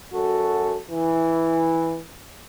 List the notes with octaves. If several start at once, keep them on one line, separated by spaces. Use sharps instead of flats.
F#2 F#4 A4
E3